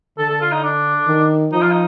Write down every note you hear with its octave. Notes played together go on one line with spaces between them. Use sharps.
D3 A4
A4
F4
D#4
D4
D#3
F3 D#4
F4
D#4